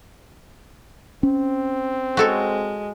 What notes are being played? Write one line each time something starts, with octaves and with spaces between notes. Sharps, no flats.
C4 C#4
G#3 F#4 A4 C#5